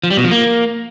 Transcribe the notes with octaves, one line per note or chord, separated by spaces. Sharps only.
F3
G3
B2
F3
A#3